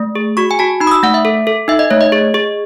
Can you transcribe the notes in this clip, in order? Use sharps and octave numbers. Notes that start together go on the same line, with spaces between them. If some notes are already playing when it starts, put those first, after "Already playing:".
Already playing: A3
G#4
F#4 C#6
G#5
F#4 A5
D#4 B5
D#6
E6
A3 F#5
E5
A4
A4
D#4 E5
D#5
A3 C#5
D#5
G#4
G#4